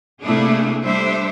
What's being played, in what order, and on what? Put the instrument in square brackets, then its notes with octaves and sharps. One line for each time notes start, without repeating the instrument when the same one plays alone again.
[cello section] C3 A3 A#3 D4 E4 G#4
G3 A3 D4 C5 E5